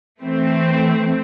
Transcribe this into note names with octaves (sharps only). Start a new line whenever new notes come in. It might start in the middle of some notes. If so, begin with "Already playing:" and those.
E3 A3 C4